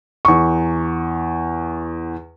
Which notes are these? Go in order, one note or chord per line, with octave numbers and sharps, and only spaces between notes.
E2 C#6